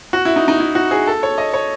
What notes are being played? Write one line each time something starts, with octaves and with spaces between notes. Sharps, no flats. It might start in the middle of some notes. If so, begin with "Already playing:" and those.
F#4
E4
D#4
D#4
E4
F#4
G#4
A4
C#5
D#5
C#5